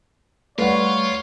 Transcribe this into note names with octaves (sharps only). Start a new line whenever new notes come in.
G3 A3 F4 B4 C#5 D5 F#5